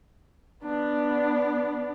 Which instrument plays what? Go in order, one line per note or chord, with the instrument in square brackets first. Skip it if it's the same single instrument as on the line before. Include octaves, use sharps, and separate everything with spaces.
[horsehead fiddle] B3 D4